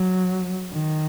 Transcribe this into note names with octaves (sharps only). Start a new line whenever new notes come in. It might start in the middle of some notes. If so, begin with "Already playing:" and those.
Already playing: F#3
D#3